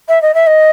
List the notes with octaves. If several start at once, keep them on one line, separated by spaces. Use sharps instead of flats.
E5
D#5
E5
D#5